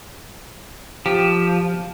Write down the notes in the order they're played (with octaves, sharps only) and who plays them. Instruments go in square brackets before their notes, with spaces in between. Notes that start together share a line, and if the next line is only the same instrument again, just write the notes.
[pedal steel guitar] F3 [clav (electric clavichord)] G4